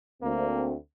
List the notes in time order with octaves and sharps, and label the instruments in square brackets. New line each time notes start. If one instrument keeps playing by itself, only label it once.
[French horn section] D2 C4 [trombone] A#3